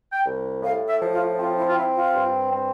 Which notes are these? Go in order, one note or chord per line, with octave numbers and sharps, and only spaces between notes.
G5
C2
A2 F5
E5
F3
F4
C4 F4
E4
F4
C4 E4
F4
G2
C4